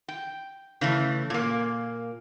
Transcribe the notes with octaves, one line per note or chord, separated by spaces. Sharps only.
G5
C#3 E3 A3
A#2 A#3